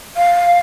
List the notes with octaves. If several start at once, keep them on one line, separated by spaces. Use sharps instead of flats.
F5